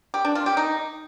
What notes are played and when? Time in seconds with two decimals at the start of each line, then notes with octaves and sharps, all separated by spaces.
0.14 G4
0.25 D4
0.35 F4
0.46 G4
0.57 D#4